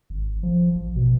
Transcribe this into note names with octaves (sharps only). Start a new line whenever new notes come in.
G#1
F3
A1
B2